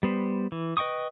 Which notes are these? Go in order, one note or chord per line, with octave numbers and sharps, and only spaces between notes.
G3 B3 C5
E3
B4 D#5 G5 C#6 D#6